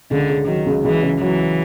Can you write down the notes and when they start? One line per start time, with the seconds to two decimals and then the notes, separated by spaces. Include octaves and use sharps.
0.11 C#2 D3
0.30 C#3
0.47 D#3 F#3
0.67 C#2
0.84 C#2 E3
1.03 C#3
1.21 E3 F#3